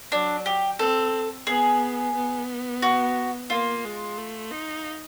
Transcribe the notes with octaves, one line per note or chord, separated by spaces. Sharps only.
F#3 D4
G4
C4 A4
B3 G#4
B3
F#4
A#3 F4
G#3
A3
D#4